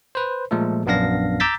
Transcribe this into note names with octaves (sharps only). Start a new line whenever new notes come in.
B4 C5
A#2 F3 G#3 A3 A4
A#1 F#2 B3 D4 F5 A#6
A#5 D6 E6 G6 A6 B6